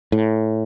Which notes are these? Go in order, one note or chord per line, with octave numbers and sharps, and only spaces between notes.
A2